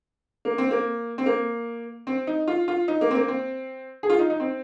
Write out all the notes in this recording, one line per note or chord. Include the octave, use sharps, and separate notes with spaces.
A#3
C4
A#3
C4
A#3
C4
D#4
F4
F4
D#4
A#3
C4
A#3
C4
G#4
F4
D#4
D#4
C4